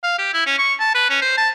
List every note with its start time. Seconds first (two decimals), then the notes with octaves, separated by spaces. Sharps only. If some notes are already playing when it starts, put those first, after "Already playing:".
0.04 F5
0.19 G4
0.34 E4
0.46 C#4
0.59 C#6
0.80 A5
0.95 B4
1.10 C#4
1.22 C5
1.38 A5